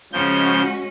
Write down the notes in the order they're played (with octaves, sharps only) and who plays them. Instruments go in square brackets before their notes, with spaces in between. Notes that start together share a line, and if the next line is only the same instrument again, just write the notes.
[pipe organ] C#3 F3 G6 [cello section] G#3 C#4 F#4